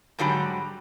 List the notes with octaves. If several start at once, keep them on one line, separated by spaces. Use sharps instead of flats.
G#2 D3 F#3 G3